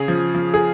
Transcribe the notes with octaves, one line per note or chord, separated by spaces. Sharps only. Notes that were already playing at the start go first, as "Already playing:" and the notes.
Already playing: C#3 G#4
F3
F3
G#4